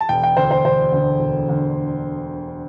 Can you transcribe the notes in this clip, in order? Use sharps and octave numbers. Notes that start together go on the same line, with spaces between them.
A5
E1 G5
G5
D2 D3 C5
C5
E1 C5
D2 D3
E1
D2 D3